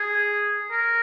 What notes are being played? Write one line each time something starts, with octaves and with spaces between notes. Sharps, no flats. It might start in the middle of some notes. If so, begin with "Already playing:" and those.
Already playing: G#4
A#4